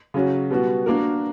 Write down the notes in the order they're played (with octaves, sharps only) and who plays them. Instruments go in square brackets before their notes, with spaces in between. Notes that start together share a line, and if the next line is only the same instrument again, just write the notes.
[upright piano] C#3 F#3 C#4 F#4
B2 G3 B3 F#4
A#3 D4 F#4 A#4